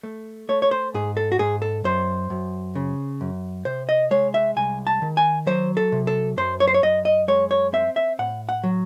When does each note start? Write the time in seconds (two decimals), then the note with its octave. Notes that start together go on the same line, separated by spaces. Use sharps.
0.03 A3
0.49 A3 C#5
0.62 C#5
0.71 C5
0.94 G#2 G#4
1.17 A4
1.32 F#4
1.39 G#2 G#4
1.62 A4
1.84 F#2 C5
2.30 F#2
2.75 C#3
3.21 F#2
3.65 C3 C5
3.89 D#5
4.11 G#3 C#5
4.34 E5
4.56 C2 G#5
4.87 A5
5.02 D#3
5.17 G#5
5.47 F#3 C5
5.77 A4
5.92 C3
6.07 A4
6.37 F#2 C5
6.60 C#5
6.68 C5
6.74 C#5
6.83 F#2 D#5
7.05 D#5
7.28 G#3 C#5
7.51 C#5
7.73 C4 E5
7.96 E5
8.19 A2 F#5
8.49 F#5
8.64 F#3